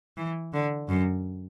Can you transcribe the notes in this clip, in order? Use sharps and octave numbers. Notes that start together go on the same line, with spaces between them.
E3
D3
F#2